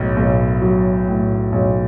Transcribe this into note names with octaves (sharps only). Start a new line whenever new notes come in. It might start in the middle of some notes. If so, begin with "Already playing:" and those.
Already playing: B1 A2
B1
F#3
A2
B1